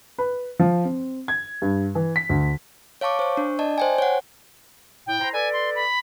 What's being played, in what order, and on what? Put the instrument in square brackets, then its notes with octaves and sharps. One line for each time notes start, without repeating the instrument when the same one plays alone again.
[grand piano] B4
F3
C4
G#6
G2
E3
B6
D2
[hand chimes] C#5 F5 A5 C#6 D6
C5 C#6
D4
D5 D#5 A5
C5 G5 G#5
C#5 F#5
[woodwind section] A2 [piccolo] G5
[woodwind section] E4 C5 A#5
[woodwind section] A4 B4 D5 [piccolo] G#5
[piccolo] C6
B5